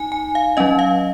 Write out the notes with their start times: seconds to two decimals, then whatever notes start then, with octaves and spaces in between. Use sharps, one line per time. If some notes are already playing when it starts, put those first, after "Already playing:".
Already playing: D#4 G#5
0.12 G#5
0.35 F5
0.57 F#3 C#4 D#5
0.79 F5